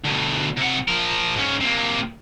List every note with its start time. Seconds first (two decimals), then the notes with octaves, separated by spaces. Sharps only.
0.04 D2 B2
0.57 C3 F#5
0.88 F3 A#4
1.36 G#2 C#4
1.61 C3 A#3